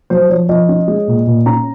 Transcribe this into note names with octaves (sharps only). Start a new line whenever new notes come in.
F#3 C5
F3 C#5
F3 D#5
C#4
G#3
A#2
A#2
C#4 A#5